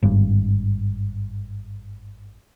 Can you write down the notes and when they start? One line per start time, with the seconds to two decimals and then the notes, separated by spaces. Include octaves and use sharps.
0.03 G#1 G2